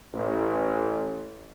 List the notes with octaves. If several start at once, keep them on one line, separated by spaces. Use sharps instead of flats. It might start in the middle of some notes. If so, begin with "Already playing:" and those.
A1